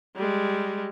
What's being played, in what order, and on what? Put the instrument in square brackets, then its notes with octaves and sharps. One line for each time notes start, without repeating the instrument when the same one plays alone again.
[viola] G3 G#3